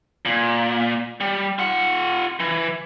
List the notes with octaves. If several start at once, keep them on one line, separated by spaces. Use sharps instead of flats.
A#2
G3
F4 F#5
E3